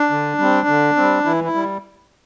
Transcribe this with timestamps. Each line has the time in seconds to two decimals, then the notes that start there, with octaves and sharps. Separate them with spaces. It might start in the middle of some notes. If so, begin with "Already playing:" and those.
Already playing: D4
0.10 D3
0.39 G3 C4
0.68 D3
0.96 G3 C4
1.25 E3 E4
1.44 E4
1.55 G3